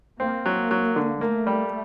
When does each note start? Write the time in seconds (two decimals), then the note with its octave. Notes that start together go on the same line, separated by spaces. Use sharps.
0.20 A#3 C4
0.46 F#3
0.71 F#3
0.96 D3
1.21 A3 A#3
1.47 G3